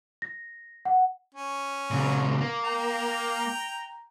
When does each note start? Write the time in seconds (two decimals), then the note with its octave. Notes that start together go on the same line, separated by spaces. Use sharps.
0.22 A#6
0.85 F#5
1.34 C#4
1.91 A#2 C#3
2.41 A#3
2.64 G5 A#5